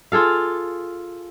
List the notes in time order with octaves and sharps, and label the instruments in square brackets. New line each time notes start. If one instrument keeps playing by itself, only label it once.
[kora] F4 G#4 A4 F5